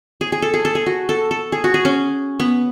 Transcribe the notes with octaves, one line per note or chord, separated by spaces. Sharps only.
G#4
G#4
A4
G#4
A4
G#4
F#4
A4
A4
G#4
F#4
G#4
C#4
B3